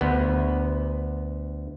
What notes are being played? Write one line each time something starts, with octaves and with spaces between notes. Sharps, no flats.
D2 B3